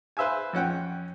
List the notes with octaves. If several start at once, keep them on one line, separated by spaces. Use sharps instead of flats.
B4 C5 E5 F5 G#5
F2 C#4 F#5 G5